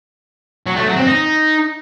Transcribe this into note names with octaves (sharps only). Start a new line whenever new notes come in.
F#3
A3
F#3
C4
D#4